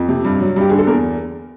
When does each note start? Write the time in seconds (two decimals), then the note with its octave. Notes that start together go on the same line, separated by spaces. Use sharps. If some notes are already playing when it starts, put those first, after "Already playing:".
Already playing: F2
0.09 C3
0.25 G2
0.40 F#3
0.56 G2 G4
0.70 D3 G#4
0.79 A4
0.87 E2 A#4